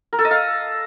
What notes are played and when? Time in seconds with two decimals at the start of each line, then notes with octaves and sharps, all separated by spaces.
0.13 A#4
0.19 A4
0.25 D#5
0.31 F5